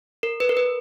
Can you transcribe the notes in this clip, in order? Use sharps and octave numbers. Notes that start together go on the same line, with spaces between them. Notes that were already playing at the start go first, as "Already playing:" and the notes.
A#4
B4
A#4
B4